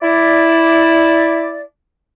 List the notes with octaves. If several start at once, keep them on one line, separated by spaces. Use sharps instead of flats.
E4 D5